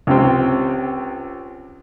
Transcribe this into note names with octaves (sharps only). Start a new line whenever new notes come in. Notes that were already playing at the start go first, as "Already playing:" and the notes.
C#2 C3 C4